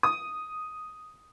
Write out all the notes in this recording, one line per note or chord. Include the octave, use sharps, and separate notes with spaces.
D#6